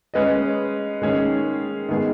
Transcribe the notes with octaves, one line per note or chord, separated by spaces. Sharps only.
G#3 C#4 B4 D#5
D#3 G#3 C#4 G#4
D#3 G#3 B3 G#4